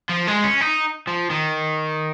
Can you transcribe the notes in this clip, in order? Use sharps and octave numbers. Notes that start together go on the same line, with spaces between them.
F3
G#3
C#4
D#4
F3
D#3